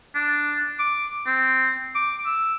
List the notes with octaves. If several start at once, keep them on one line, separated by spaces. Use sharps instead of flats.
D4
D6
C4
D6
E6